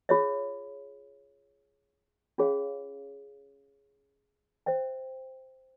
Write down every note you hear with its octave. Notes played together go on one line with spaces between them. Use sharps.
F4 G#4 C#5 E5
C#4 F4 G#4 C#5 F5
C5 E5 G5